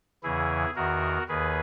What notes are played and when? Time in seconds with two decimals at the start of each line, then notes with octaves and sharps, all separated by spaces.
0.23 E2 C#3 E3 E4 G#4
0.76 E2 D#3 F#4 A#4
1.28 D#2 D#3 G#4 B4